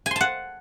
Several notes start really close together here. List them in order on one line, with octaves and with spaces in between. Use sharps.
G#5 C6 A5 F#5